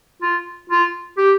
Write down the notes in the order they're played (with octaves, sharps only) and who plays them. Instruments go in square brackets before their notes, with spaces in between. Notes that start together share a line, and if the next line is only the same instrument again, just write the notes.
[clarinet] F4
F4
G4